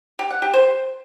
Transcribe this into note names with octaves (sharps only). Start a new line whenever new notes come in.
G4
F#5
G4
C5